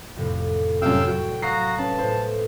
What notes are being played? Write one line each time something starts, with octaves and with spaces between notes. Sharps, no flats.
F2 A2 C3
F#2 C3 F5 G5 E6
F#3 F#4 G5 E7
F#4 F5 A#5 D#6 C7
C#4 B4 A5
A2 E4 C5